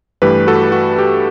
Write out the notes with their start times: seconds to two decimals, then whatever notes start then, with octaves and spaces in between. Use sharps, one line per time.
0.22 G2 E3 A3 G4 B4
0.47 F#4 A4
0.72 F#4
0.98 G4